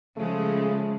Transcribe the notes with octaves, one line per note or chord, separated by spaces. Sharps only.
C#3 F3 G#3 A3